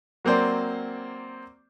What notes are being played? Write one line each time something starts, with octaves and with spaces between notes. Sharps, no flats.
F#3 A#3 C4 C5 D5